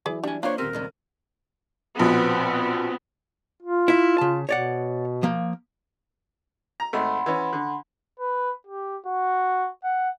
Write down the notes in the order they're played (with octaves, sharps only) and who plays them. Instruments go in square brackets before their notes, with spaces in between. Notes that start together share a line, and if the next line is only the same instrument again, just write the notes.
[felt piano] E3 F#3 E4 [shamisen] G#4 B4 D5
[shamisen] G3 [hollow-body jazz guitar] D4 G#5
[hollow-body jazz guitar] A#3 D4 C5 [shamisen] F4 [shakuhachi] C#5 [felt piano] F5 F#6
[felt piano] D#1 D#7 [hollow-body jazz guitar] C4 G4 [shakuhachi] A#4
[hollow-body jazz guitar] C#2 G2 C3
[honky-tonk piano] A#1 B2 [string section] B3 C4
[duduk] F4
[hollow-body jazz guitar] E4 E5
C#3 A5
[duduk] B2 [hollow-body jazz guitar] C#5 D5 F#5
[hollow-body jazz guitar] F3 A#3
[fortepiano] A#5
[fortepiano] G#1 A3 [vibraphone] F#5 B5 C6
[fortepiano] E3 C#4
D3
[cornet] B4
G4
F#4
F#5